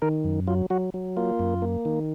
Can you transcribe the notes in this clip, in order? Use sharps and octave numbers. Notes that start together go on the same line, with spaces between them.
D#3 A#4
F#2
F#3 F4
F#3 F#4
F#3
A#3 F4
F#2
A#3
D#3